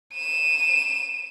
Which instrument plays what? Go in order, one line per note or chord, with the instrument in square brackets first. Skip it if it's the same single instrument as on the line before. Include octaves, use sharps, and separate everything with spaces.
[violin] D#7 E7